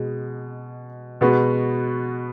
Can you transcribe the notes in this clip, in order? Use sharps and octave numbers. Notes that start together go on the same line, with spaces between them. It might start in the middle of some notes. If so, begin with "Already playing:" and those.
Already playing: B2 G#3
B2 G#3 B3 F#4